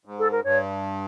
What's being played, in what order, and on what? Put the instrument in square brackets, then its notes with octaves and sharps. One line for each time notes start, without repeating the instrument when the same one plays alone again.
[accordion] G#2
[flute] A4
A#4
[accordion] G2 [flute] C#5